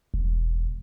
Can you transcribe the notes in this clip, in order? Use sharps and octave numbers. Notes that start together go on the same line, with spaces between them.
E1